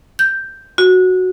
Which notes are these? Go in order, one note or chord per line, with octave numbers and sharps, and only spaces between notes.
G6
F#4